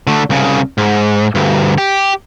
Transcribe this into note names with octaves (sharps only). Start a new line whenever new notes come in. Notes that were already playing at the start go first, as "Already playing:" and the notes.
D3 A3
C2 C#3
G#2
D2 G2
G4